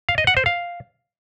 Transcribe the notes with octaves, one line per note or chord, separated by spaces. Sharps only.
F5
D#5
F#5
C5
F5